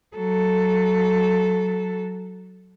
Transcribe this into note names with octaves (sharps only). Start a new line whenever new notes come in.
F#3 A4